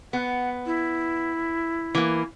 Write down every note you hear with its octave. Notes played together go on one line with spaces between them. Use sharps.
B3 F#5
E4
E3 A#3